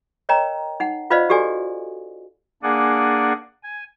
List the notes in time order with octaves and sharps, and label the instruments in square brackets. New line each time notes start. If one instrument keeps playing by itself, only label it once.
[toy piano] A#4 C#5 D#5 G5 A#5
D#4 F#5
F4 B4 C5 D5 D#5 F5
F#4 G4 A4 D5 G#5
[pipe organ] A#3 D4 G#4 D5 F#5 G#5
G#5